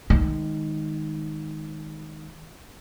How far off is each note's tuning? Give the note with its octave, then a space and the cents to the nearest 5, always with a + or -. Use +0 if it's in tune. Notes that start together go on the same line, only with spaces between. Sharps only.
D#3 +0 G#3 +0